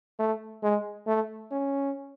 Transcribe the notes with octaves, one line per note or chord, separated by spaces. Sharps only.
A3
G#3
A3
C#4